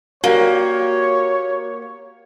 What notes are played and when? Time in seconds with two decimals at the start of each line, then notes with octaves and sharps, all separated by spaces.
0.24 A#3 F#4 G4 A#4 C#5 D5